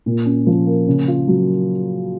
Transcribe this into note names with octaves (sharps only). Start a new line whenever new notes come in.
A#2
C#4
F3
A#3
C#3
F4
F#3